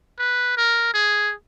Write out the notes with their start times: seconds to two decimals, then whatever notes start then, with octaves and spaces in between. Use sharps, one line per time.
0.19 B4
0.57 A#4
0.94 G#4